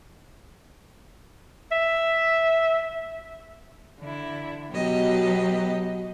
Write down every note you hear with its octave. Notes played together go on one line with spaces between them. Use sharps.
E5
D3 E4
B2 F#3 B3 G4 D#5